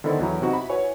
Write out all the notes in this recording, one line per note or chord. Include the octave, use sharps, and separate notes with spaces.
D3 D#3 B3 E4 A4 C5
E2 F#3 E4 A#5
C3 D#4 E4 F#4
B5
E4 F#4 B4 C#5 G#5